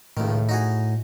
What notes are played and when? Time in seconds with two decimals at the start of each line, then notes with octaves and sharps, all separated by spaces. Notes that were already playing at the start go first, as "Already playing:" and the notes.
0.17 C#2 A2 D#3
0.49 D#4 F#4 G#4